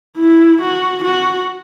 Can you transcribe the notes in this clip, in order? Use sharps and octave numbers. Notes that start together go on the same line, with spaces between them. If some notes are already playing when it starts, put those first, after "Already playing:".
E4
F#4
F#4